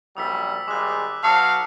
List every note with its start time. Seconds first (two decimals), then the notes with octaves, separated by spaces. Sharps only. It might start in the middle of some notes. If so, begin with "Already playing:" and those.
0.17 A#1 F#2 G3 D#6 E6 B6
0.68 G#1 G3 G#3 D6 F#6
1.23 B1 F#3 F5 A5 D#6 C7 C#7